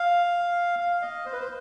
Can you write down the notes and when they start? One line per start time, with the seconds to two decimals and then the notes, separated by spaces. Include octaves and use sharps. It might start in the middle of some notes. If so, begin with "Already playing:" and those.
Already playing: F5
0.79 F5
1.02 D#5
1.25 C5
1.32 B4
1.40 C5